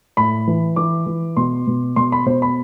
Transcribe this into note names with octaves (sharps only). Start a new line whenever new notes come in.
A2 B5
E3
E3 D6
E3
B2 C6
B2
B2 C6
B5
B2 C5
B5